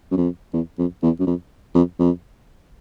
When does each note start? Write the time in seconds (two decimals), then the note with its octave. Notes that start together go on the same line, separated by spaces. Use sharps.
0.11 F#2
0.17 F2
0.53 E2
0.78 F2
1.03 E2
1.19 F#2
1.27 F2
1.75 F2
1.99 F2